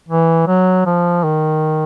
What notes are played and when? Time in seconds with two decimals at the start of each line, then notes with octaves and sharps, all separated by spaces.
0.08 E3
0.47 F#3
0.86 F3
1.24 D#3